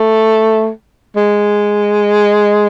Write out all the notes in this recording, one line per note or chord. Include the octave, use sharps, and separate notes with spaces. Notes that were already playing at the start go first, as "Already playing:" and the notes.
Already playing: A3
G#3